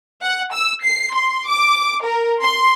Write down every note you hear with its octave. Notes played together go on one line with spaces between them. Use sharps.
F#5
E6
C7
C6
D6
A#4
C6